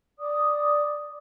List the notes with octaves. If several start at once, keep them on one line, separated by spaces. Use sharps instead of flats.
D5 D6 D#6